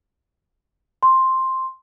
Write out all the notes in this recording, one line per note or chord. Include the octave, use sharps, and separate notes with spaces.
C6